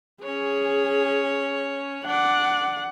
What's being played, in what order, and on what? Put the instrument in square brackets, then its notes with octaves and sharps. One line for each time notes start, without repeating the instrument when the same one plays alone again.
[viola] C#4 C#5 [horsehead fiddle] G#4
[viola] D4 D5 [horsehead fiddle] F#5